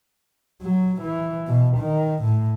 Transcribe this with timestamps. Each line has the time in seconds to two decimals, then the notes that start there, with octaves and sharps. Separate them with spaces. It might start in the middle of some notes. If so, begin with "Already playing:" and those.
0.62 F#3
1.02 E3
1.47 B2
1.77 D#3
2.23 A2